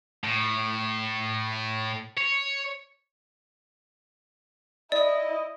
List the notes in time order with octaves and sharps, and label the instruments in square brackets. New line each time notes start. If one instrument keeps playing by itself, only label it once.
[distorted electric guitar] A2
C#5
[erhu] E4 [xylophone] D5 [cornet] D#5